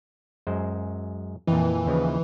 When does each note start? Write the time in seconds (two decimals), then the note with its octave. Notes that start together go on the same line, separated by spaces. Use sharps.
0.47 F#2 G#3 C5
1.47 F2 A#2 E3
1.86 D#2 C#3 F3